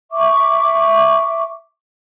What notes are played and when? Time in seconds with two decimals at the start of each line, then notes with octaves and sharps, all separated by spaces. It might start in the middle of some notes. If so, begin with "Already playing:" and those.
0.12 E5 C#6 D6